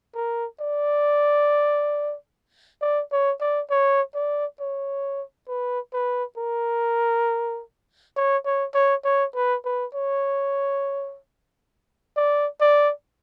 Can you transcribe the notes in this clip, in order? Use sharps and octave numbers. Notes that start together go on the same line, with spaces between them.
A#4
D5
D5
C#5
D5
C#5
D5
C#5
B4
B4
A#4
C#5
C#5
C#5
C#5
B4
B4
C#5
D5
D5